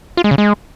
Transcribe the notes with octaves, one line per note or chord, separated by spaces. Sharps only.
F4
G#3
C#3
G#3